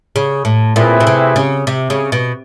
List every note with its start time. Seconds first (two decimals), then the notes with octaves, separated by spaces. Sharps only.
0.16 C#3
0.45 A2
0.76 A#2 A3 C4 E4 G#4 B4
1.00 B2
1.07 C3
1.36 C#3
1.67 C3
1.90 C#3
2.12 B2